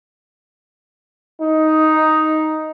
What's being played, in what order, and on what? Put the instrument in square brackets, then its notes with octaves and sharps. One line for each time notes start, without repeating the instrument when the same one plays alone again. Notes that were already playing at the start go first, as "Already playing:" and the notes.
[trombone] D#4